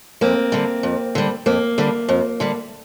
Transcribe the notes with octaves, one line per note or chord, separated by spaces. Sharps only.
F2 A#3 C4
D3 G3
F2
D3 G3
F2 A#3
D3 G3
F2
D3 G3